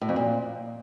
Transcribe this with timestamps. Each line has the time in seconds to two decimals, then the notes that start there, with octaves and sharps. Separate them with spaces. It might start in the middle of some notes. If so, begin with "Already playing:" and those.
0.01 A2
0.09 F2
0.16 A#2